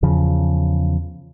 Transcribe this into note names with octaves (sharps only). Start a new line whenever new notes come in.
E2 C#3 F3